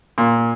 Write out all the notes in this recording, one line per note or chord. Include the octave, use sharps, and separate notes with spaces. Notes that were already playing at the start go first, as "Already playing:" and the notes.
A#2